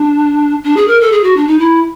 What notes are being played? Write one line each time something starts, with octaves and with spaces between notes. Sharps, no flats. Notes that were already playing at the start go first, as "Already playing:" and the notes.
Already playing: D4
D4
G#4
A#4
A4
G#4
F#4
D4
D#4
E4